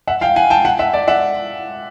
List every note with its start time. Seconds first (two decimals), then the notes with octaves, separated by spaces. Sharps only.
0.07 E5 F#5
0.21 F5 G5
0.36 F#5 G#5
0.50 G5 A5
0.65 F#5 G#5
0.79 E5 F#5
0.93 D5 E5
1.08 E5 F#5